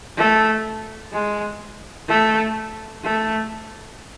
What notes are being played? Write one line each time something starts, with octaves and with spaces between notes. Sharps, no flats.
A3
G#3
A3
A3